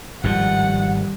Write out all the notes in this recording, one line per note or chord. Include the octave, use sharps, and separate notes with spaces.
G#1 A2 F3 G3 F#5